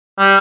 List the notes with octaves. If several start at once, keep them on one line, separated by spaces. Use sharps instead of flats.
G3